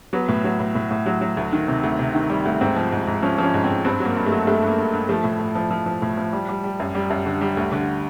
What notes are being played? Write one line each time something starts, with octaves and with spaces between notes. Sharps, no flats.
F#3 B3
A2
F#3
A2
A2
A2
F#3
F#3
D2
D#3
C3
D2
C3
D#3
G3
D2
G#2 C4
F3
G#2
G#2
F3 C#4
F3 C#4
G#2
C4
G#2
G2 C4
F#3 A#3
G2
A3
F#3
G2 A3
G2
A#3
G2
G2
F3 A3
A2
A2
F3
F3
F3
A2
F3
G3
G3
G3
F#2
G3
F#2
D3
G3
D2
D3